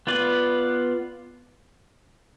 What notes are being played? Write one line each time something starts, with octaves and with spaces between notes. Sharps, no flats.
B3 F4 B4 D5